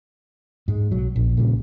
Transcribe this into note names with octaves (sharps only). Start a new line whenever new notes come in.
G#2 G#3
B1 F#3
A#1
A#2 C#3 G3